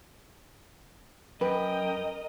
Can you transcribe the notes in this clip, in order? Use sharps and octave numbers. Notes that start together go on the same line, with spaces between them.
F#2 A#4 B4 D#5 G5